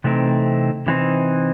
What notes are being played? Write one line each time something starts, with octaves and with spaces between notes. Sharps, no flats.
C3 E3 A3 C4 D#4
C3 E3 A3 C4 D#4